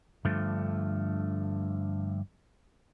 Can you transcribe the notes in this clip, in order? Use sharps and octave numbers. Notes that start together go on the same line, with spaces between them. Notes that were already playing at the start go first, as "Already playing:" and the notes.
G2 D3 F3 A3